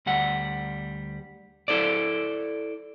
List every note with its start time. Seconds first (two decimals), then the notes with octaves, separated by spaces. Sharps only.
0.06 D2 G3 F#5
1.68 E4 A4 C5 D5